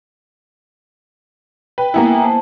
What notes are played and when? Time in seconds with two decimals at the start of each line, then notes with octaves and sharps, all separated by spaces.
1.78 B4 G5
1.94 A#3 B3 E4 G5 G#5 A#5
2.24 A#3 C5 A5